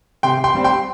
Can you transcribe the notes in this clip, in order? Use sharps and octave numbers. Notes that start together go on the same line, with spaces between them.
C3 G5 C6
G5 C6
G3 C4
G5 C6